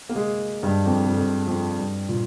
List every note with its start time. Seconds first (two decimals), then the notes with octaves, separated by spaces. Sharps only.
0.09 A#3
0.16 G#3
0.63 G2
0.85 F2
1.05 F2
1.17 F2
1.47 F2
1.78 G2
2.09 A#2